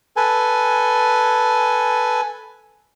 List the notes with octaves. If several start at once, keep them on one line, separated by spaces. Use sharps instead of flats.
A4 B4 G#5